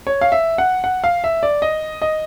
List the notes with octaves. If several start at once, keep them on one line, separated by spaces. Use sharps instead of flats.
C#5
F5
E5
F#5
F#5
F5
E5
D5
D#5
D#5